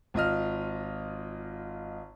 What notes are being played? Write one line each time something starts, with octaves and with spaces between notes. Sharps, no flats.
G#1 F4 D#5 F6